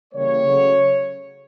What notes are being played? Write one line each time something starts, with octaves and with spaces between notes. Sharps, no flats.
C#3 E3 G3 A#3 C#5
C#3 F#3 A3